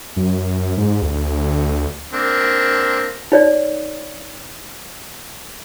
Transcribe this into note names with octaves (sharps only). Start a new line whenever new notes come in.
F#2
G#2
D2
A#3 C4 D4
D#4 C#5 D5